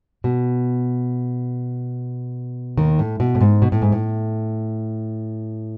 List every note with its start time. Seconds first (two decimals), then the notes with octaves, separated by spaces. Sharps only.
0.24 B2
2.77 D#2 D#3
2.99 A2
3.20 B2
3.35 A2
3.41 G#2
3.62 B2
3.72 A2
3.82 G#2
3.92 A2